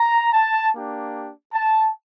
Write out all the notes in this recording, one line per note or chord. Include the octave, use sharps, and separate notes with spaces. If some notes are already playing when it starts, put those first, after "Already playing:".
Already playing: A#5
A5
A#3 D4 G4
A5